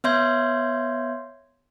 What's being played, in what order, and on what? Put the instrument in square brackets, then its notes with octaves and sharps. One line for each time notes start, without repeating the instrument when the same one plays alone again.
[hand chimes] B3 C#5 E5 C6 G6 G#6